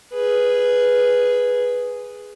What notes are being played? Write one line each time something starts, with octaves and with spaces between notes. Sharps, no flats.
G#4 B4